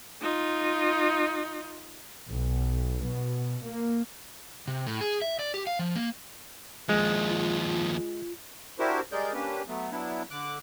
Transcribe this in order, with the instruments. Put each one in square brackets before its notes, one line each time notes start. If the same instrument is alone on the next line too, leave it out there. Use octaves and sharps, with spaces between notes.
[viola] D#4 F4
[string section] B1
B2
A#3
[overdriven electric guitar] C3
A2
G#4
E5
D5
G4
F5
F3
A#3
[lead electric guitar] D#2 F3 [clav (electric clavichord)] G#3
[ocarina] F4
[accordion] D4 E4 F#4 G4 A#4 C5
G3 G#3 G#4 A#4 D5 G6
A#3 C#4 D4 G4 B4
F#3 A3 B3
F#3 B3 D4 E4
D3 D6 F#6